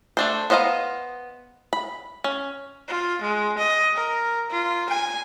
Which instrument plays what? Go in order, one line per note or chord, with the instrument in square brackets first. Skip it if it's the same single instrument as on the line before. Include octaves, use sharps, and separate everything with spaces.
[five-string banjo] A3 D4 C5
B3 C5 D#5 F5 A#5
B5
C#4
[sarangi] F4
G#3
D#5
A#4
F4
G#5